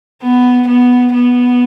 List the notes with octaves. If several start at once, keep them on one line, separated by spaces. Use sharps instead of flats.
B3
B3
B3